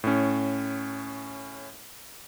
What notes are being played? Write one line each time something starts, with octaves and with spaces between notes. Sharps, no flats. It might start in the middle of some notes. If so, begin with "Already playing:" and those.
A2 C#4